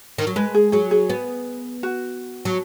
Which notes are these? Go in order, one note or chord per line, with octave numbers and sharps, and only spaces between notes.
D#3
F#3
G#3 B4
G#4
F#3 G#4
G#4
B3
F#4
F#3